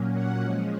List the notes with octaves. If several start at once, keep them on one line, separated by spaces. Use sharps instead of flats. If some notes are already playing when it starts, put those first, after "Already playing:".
Already playing: A#2 F#3 A#3 C#4
F#5
F3 G#3 C#4